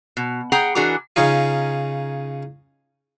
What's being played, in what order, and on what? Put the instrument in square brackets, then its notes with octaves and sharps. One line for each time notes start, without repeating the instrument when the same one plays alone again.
[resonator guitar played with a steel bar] B2
G#4 F#5 G5 A#5
E3 D4 F#4 G#4 A#4
[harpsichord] C#3 C#4 D#4 F4